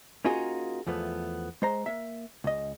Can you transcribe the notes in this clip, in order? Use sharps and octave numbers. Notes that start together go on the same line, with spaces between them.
A#3 C#4 D#4 F4 F#4 G#4
E2 F3 A3 B3
G#3 C5 A#5
A#3 E5
C#2 D#5